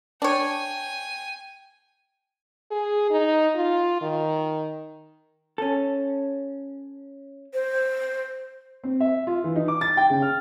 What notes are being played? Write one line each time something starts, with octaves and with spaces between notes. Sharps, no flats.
D4 C#5 G5 G#5
G#4
D#4
F4
D#3
C#4 A4
C5
C4
E5
F4
E3
D#4
D6
A6
G5
C#3
F6